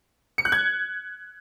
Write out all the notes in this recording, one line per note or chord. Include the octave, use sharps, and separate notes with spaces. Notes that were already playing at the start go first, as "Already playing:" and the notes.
C#7
F#6
G#6